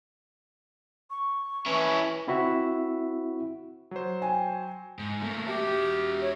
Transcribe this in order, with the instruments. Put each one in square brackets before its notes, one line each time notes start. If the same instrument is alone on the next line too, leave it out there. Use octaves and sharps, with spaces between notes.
[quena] C#6
[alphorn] E3 [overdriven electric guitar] C#4 E4
[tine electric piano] C4 E4 F#4 E5
[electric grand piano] F#3 C5
[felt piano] G5 G#5
[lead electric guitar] G#2
A3 A#3
[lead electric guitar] F#4 E5 [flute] G4
[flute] C#5